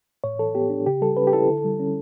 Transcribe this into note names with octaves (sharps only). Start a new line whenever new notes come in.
A2 C#5
E3 A4
B3 G4
D4
C#3 G4
G3 A4
C#4 B4
G4
E4 A4
D3
G3
C#4